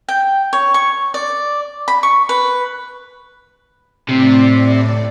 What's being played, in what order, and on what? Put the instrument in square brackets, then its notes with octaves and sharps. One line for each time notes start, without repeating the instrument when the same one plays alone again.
[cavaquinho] G5
C#5
C#6
D5
B5
C#6
B4
[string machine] A2 D5 [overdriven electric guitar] C3